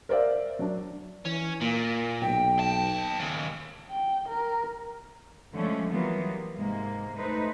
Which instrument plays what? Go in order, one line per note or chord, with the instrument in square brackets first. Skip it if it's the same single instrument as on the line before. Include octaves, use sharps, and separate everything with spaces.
[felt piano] A#4 C5 D5 E5 F5
F#3 D4
[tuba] E3 [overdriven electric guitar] C#4
[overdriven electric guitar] A#2 [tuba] A#3
[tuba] B1 [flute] G5
[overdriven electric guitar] D#2 A5
D#2 C#3
[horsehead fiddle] G5
A#4
[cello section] D3 F3 G#3 A3 C#4
E3 F#3 G3 A#3 B3 F4
G3
G#2 C3 G#3 A#3
A3 D#4 B4 C5